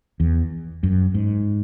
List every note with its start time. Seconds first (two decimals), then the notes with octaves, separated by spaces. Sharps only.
0.20 E2
0.83 F#2
1.14 G#2